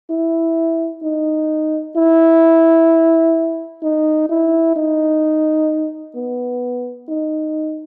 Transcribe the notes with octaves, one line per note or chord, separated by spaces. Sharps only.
E4
D#4
E4
D#4
E4
D#4
B3
D#4